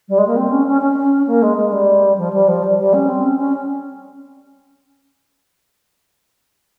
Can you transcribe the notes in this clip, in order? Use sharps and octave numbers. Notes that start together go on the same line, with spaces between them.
G3
G#3
A#3
C4
C#4
C#4
C#4
A#3
G#3
G#3
G3
F3
G3
F3
G3
G3
C#4
C4
C#4
C#4